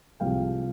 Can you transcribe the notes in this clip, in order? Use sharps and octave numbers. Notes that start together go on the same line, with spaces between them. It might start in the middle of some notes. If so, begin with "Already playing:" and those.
C2 C3 F3 G#3 F5 G5